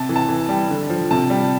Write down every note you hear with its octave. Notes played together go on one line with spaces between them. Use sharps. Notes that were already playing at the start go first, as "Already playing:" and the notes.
Already playing: C3 A5
E3
A5
E3
G3
D3
F3
C3 A5
G3